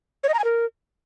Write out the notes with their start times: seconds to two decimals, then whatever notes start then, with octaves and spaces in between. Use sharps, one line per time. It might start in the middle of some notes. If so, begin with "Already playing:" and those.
0.24 C#5
0.29 D#5
0.34 A#5
0.39 G#5
0.44 A#4